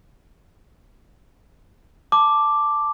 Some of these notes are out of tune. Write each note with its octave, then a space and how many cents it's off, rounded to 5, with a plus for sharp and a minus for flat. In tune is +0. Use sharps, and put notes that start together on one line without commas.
A5 +0 D6 +0